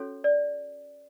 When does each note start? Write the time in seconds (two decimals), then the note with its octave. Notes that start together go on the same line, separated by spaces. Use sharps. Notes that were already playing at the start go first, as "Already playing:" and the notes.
Already playing: C#4 F#4 A4 C#5
0.24 D5